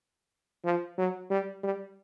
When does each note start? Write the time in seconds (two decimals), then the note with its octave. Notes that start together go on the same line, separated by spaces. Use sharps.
0.64 F3
0.98 F#3
1.30 G3
1.63 G3